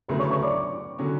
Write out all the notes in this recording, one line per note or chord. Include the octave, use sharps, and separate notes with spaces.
D2 C#3 F#3 A3 B4 B5
C#5 C#6
C#5 C#6
D5 D6
D3 F#3 C#4